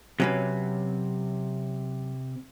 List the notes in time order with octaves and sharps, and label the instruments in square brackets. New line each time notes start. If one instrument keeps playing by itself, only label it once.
[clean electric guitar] C3 [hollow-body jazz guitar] F#3 C#4 B4